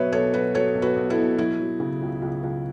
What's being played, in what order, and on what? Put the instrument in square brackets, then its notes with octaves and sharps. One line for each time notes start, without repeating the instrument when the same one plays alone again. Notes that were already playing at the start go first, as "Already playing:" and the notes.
Already playing: [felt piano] B2 F#3 B4 C#5 E5
B1 A4 C#5
F#3 F#4 B4
F#3 A4 C#5
B1
F#4 B4
B1
E4 A4
B2
F#3 E4
F#3
C#3
C#2
C#2
C#2